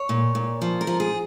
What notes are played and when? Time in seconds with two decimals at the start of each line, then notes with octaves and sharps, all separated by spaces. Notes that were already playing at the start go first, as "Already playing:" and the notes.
Already playing: C#5
0.09 A#2
0.35 A#2
0.62 F3
0.81 A#4
0.87 F3
1.00 G#4